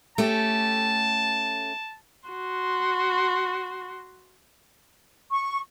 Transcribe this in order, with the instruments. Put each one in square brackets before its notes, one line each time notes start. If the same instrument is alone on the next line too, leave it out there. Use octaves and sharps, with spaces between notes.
[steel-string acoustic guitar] A3 C#4 G4 [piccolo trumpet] A5
[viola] F#4 C6
[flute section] C#6